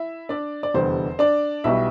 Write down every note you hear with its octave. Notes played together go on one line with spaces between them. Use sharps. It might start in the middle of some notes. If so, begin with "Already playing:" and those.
Already playing: E4 E5
D4 D5
D5
F1 E2 D3 G3 C5
D4 D5
B1 B2 G3 E4 E5